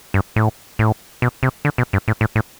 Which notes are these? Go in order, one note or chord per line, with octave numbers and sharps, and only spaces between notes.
G2
A2
A2
B2
C3
D3
B2
G2
A2
A2
A2